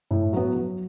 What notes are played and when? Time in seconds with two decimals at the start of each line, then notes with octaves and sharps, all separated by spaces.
0.11 A2
0.33 F#3 B3
0.55 F#3